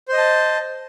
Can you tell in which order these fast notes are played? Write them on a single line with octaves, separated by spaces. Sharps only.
C5 D#5 A5